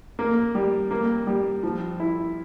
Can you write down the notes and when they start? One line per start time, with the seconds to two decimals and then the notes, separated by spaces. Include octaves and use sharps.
0.19 A#3
0.55 G3
0.91 A#3
1.27 G3
1.63 F3
2.00 E4